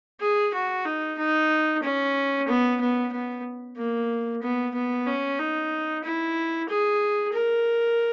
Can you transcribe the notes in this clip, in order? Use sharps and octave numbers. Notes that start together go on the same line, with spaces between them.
G#4
F#4
D#4
D#4
C#4
B3
B3
B3
A#3
B3
B3
C#4
D#4
E4
G#4
A#4